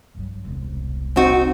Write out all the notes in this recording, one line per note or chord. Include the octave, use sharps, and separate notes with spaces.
G2 F#3
E1 C2
C4 D#4 F#4